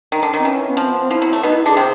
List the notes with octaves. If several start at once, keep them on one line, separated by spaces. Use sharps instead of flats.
D#3
D3
D#3
C4
E3 C#4
B3
F3 C4
B3
C4
F3 E4
F#3
A3
B2 B3 D#4
E4
D3 D4 G#4
C3 C4